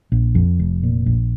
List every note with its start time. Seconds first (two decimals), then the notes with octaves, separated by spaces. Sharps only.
0.12 A#1
0.35 F2
0.59 F1
0.83 A#2
1.06 A#1